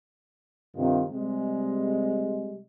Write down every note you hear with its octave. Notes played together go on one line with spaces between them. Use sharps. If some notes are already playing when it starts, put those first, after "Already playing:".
G2 C3 D#3 F4
C3 G3 G#3